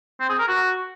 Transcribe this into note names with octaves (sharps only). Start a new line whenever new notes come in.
C4
G#4
A#4
F#4